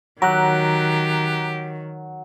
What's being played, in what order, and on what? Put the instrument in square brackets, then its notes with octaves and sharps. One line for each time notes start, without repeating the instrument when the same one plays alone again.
[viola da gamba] D#3 [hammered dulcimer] F#3 [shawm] G4 [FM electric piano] A#5 F#6